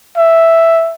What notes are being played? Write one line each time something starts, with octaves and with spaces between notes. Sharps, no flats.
E5